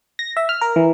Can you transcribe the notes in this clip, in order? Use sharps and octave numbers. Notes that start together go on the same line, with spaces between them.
A#6
E5
F6
A#4
E3